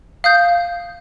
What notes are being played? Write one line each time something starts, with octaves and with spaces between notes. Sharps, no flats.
F5 D#6 G6